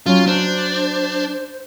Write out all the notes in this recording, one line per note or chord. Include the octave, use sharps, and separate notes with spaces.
F#3 C#4 F4
D4 C5